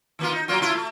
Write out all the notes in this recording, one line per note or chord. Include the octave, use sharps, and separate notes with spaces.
D#3 A#3 F4
D#4
F#3 A#3 F4
A3 E4 F4
A3